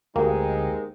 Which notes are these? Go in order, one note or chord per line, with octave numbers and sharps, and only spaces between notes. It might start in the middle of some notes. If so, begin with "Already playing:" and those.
D2 G#3 A#3 C4 D#4 G4 F5 G5